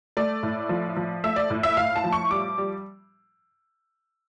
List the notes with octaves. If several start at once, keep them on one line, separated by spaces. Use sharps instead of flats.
A3 D5
A2
F3
F3
A3 E5
D5
A2
E5
A2 F5
A5
F3
C#6
G3 D6
G3